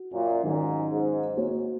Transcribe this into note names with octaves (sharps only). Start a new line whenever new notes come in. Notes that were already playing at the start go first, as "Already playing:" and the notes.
Already playing: F#4
F#2 A#2
G#2 D#3 F#3 C#4
G#2
A#3 F#4 C#5